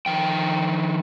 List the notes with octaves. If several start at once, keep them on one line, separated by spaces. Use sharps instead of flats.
D#3 F3 G5